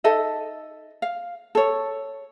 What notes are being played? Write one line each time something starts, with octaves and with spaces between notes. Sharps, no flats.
D#4 A4 D#5 E5
F5
A4 C#5